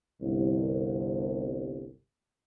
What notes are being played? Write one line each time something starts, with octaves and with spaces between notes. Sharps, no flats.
G1 C2